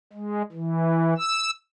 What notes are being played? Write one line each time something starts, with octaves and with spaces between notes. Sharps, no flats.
G#3
E3
E6